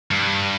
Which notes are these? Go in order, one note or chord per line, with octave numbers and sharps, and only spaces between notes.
G2